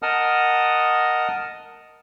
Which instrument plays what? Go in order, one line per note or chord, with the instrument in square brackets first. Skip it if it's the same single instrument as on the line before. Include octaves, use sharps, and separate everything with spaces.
[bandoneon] A#4 D#5 F#5 A5 D#6 F6